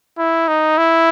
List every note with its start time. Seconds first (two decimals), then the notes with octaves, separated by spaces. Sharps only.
0.18 E4
0.48 D#4
0.78 E4